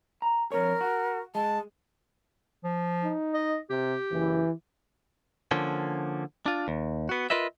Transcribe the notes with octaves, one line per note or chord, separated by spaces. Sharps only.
A#5
F2 B2 A#4 C#5
F#4
G#3 A5
F3
D#4
D#5
C3 G4
F#1 E3
D3 F3 A#3 C#4
D4 F4
D#2
B3 F#4
F4 A#4 B4 D#5 E5